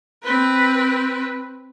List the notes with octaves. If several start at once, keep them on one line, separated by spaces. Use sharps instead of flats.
C4 B4